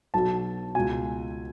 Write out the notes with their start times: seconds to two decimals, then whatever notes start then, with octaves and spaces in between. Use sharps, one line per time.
0.14 B1 B2 A5
0.75 C#2 B2 G#5